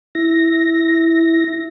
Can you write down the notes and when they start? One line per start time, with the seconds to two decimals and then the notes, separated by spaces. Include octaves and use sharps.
0.15 E4 A#6